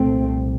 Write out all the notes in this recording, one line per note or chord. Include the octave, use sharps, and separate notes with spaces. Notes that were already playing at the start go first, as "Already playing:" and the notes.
Already playing: C2 A#2 A3 C4